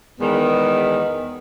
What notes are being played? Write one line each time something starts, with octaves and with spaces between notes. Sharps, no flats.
E2 D#3 G#3 B3